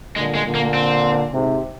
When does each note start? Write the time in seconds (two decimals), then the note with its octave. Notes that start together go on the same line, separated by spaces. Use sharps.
0.16 A#2 D3 G#3
0.35 G#3
0.45 A#2 D3
0.55 A#3
0.74 C4
1.32 G#2 C3